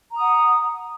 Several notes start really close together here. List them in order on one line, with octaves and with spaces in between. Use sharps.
A#5 D#6 F#5